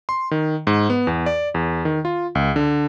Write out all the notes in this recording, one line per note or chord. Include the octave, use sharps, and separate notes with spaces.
C6
D#3
G#2
B3
E2
D5
E2
D#3
F4
C#2
D3